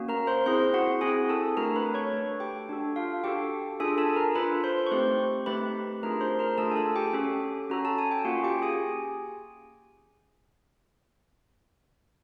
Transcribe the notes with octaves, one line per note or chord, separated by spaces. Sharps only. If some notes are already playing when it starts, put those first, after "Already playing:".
Already playing: A#3 C#4 F#4
A#4 A#5
C5 C6
C4 E4 G#4 C5 C6
F#4 F#5
C4 E4 G#4 G#5
A4 A5
A3 D4 F#4 A4 A#4 A#5
B4 B5
C#5 C#6
A3 D4 F#4 A4
G4 G5
D4 F#4 A4
F4 F5
D4 F#4 G4 A4 G5
D4 F4 G#4 A4 G#5
A4 A5
A#4 A#5
D4 F4 A4 B4 B5
C5 C6
C#6
A3 C4 D#4 G4 C5 C6
A3 C4 D#4 G4 B4 B5
A3 D4 F4 G#4 A#4 A#5
C5 C6
A#4 A#5
A3 D4 F4 G#4 A4 A5
G#5
A4 A5
G4 G5
C#4 F#4 A4
C#4 F#4 A4 A#5
A5
G#5
G5
A#3 C#4 F4 F#4 F#5
G4 G5
G#4 G#5